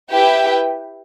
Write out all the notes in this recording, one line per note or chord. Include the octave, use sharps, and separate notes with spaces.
E4 G4 B4 E5 G5